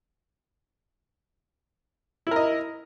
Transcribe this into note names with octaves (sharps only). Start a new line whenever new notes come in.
E4 A#4 D#5